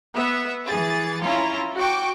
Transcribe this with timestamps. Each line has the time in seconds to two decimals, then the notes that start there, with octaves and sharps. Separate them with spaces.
0.15 B3 E5
0.67 E3 G#4 A6
1.23 C#4 E4 F4 A#5
1.76 F#4 G5 C#6 D6